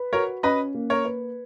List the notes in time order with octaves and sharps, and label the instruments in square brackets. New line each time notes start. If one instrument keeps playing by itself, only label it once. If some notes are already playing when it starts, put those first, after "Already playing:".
Already playing: [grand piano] B4
[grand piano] F#4 [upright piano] A#4 C#5
[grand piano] C#4 [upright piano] B4 D#5
[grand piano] A#3
[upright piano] A#4 C#5
[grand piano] B4